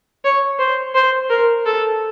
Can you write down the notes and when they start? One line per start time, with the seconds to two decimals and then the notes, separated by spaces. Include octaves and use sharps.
0.25 C#5
0.59 C5
0.95 C5
1.30 A#4
1.66 A4